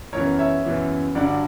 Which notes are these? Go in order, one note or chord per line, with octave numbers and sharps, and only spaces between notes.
F#2 C#3 E3 B3 A#4 C#5
C#5 E5
F#2 C#3 E3 B3
G2 D3 F#3 D5 F#5